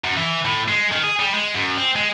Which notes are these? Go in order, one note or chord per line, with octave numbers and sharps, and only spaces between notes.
F#2
E3
A2
G#3
D#3
G#4
G3
G#3
F#2
C4
G#3